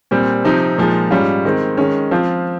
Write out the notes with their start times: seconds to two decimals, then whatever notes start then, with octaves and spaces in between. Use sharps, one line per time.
0.11 A#2 G3 C4
0.44 C3 F3 C4 D#4 G4
0.78 A#2 F3 G#3 D#4
1.11 G#2 G3 C#4 F4
1.45 D#3 G#3 C4
1.77 D#3 G#3 C#4
2.11 F3 C4 F4